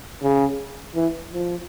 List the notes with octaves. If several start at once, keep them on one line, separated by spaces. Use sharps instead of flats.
C#3
E3
F3